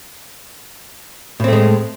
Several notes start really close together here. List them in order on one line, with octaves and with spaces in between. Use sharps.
A2 C4 A3 G#3